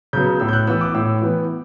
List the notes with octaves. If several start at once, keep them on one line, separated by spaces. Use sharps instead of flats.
C#3 F#3 B3 G6
A2 E6
G6
F#6
E3 B3 E6
D6
A2 E6
E3 B3